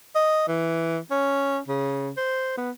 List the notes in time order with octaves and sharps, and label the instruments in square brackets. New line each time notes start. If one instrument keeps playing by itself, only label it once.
[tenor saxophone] D#5
E3
C#4
C#3
C5
B3